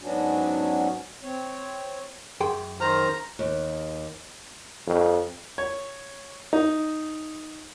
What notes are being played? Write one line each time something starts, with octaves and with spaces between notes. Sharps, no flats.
G#2 F#3 B3 C#4 D4 F#4
C4 C#5
F#2 G#4 G5 C6
D#3 C5 A#5 F6
D#2
F2
C#5
D#4